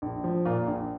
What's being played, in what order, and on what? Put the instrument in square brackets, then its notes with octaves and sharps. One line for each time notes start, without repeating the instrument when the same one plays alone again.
[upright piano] A#1
F3
A#2 F4
A#1